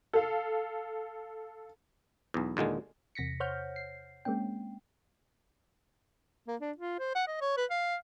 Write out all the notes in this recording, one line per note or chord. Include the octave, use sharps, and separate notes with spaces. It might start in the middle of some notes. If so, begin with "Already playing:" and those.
A4 F5
B1 E2
D#2 A#2 D3 G#3
E2 C3 A#6 B6 C#7
C5 C#5 F#5 F6 G6
C7
G#3 A#3 C4 C#4 G5
A#3
D4
F4
C5
F#5
D#5
C#5
B4
F5